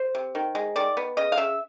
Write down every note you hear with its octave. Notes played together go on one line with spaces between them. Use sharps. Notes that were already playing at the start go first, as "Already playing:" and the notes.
Already playing: C5
C3
D#3
G#3
D#3 D5
B3
C#3 D#5
F5
C#3 E5